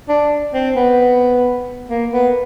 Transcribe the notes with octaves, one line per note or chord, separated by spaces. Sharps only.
D4
C4
B3
A#3
B3